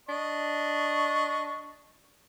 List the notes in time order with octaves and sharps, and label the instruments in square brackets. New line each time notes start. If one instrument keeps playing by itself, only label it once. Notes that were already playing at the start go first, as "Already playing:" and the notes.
[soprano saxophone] D4 [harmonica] D#5 C#6